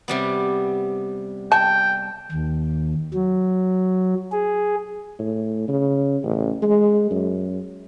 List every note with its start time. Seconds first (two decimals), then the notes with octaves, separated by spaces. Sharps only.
0.08 C3 G3 B3
1.52 G5 A5
2.32 D#2
3.14 F#3
4.32 G#4
5.19 A2
5.68 C#3
6.24 A1
6.62 G#3
7.11 F#2